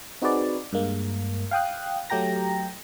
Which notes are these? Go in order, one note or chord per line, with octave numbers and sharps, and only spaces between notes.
C4 D#4 F#4 G#4 B4 D5
G2 G#3 A#3
F5 G5 D#6 F#6
F#3 A3 G4 G5 A#5 A#6